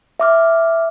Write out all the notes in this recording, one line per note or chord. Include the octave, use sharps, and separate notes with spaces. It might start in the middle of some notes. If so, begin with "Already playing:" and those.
E5 D6 F6